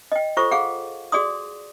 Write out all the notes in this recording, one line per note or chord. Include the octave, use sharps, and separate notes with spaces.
D#5 G5
F4 A4 C5 C#6
G#4 F5 F#5
F#4 G#4 D5 C6 D#6